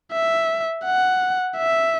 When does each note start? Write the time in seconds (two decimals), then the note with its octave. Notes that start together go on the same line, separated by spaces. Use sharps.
0.13 E5
0.84 F#5
1.57 E5